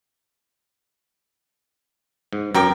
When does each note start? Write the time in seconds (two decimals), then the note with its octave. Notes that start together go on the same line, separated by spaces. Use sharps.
2.33 G#2
2.55 F#2 A#4 G5 D6